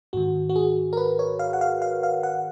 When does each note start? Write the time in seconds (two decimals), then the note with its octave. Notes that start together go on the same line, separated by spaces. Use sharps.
0.13 G#2 D#3 F#4
0.49 F#4
0.56 G#4
0.93 A#4
0.97 B4
1.19 C#5
1.39 F5
1.53 F#5
1.61 F5
1.82 F5
2.03 F5
2.23 F#5